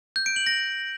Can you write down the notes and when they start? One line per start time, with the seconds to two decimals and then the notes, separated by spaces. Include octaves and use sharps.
0.16 G6
0.26 D7
0.36 F#7
0.46 A#6